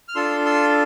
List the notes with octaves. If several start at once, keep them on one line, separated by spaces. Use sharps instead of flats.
F6
D4 F4 A4 C6 E6
C6 E6